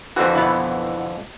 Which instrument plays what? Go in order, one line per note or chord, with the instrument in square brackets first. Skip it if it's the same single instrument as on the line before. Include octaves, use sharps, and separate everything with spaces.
[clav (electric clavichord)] F2 D3 E3 [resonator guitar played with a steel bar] F#4 C5 F5
[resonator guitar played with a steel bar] B2 B3 E4